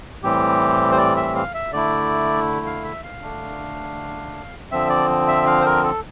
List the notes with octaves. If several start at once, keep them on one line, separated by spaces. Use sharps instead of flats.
A2 E3 G3 C4 G4
C5
D5
E5
F5
E5
D3 A3 E4 D5
F5
E5
F5
D3 A3 D4
D3 F3 C4 E5
D5
E5
F5
C5
A#4
A4